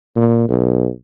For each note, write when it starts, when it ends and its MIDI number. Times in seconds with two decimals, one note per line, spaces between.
0.16 0.47 46
0.49 0.89 35